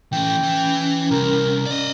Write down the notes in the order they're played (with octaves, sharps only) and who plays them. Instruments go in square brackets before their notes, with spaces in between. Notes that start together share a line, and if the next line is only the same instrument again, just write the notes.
[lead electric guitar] E3 A3 [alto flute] C#4 [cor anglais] G5
[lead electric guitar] E3
[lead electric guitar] C2 [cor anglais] A#4
[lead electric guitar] D5 D#5